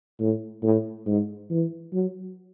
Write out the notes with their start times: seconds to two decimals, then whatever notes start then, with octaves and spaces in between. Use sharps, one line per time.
0.19 A2
0.63 A2
1.06 G#2
1.50 E3
1.93 F#3